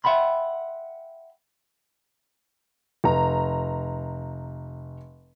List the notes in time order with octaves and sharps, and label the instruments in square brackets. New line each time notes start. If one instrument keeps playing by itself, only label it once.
[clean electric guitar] E5 F#5 G5 B5 C6
[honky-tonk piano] F1 A#5